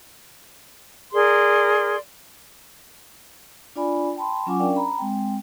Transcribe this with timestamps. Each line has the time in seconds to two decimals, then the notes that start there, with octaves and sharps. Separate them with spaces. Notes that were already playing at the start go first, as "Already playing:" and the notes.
1.13 G#4 A#4 D5 C6
3.76 D4 F4 D5 G#5 B5
4.16 G5 A5 B5 C6
4.46 F#3 C#4 F4 F#5 G#5 D6
4.59 C#4 D4 A#4 D5 F5 G5
4.76 A#5 B5
4.98 G#3 C4 G5